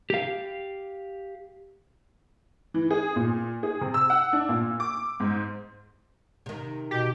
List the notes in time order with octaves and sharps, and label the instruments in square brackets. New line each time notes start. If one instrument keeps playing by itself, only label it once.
[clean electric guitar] G4 F5
[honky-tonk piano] E3
G#4
A#2
G#4
C3
E6
F#5
D4
A#2
D6
G#2
[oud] C3 D#3
[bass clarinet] B2 [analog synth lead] G4